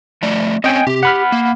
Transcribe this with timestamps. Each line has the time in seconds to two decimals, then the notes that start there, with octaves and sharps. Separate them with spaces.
0.22 F3 A3 D5
0.64 C4 C#4 D#5 G5 G#5
0.87 C3 G4
1.03 F#5 B5 F6
1.32 A#3